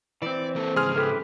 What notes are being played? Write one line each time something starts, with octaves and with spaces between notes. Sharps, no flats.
E3 C4 D5
A#3 A4
G#2 C#3 G#4 C6 F6
E3 G4 A4 B4